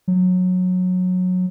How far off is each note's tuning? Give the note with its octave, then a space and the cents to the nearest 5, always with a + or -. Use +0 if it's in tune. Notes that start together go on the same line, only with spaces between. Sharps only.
F#3 -20